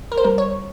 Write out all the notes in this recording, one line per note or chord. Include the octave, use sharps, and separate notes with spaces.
A#4
C5
G3 A#4
C#5